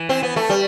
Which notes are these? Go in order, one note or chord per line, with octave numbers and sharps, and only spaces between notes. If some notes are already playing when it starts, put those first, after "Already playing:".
Already playing: E3
C4
B3
A3
G3